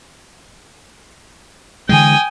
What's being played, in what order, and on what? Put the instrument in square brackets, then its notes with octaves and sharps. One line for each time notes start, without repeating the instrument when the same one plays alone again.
[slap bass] D3 E3 G#3 [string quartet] G5 G#5 D#6